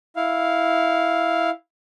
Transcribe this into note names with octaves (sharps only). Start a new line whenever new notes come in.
E4 F5